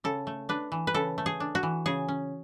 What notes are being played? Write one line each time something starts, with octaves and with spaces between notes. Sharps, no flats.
C#3 A4
A3
D4 B4
E3
B4
C#3 A4
A3
G#4
D4
F#4
E3
C#3 G#4
C#4